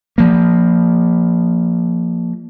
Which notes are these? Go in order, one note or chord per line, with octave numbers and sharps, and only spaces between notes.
F3 A#3